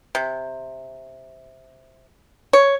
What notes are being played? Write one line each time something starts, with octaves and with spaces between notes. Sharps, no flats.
C3
C#5